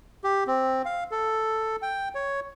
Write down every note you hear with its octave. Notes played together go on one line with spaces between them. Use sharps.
G4
C4
F5
A4
G5
C#5